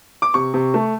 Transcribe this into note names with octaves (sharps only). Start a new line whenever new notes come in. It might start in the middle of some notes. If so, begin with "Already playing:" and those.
D6
C3 C#6
C3
A3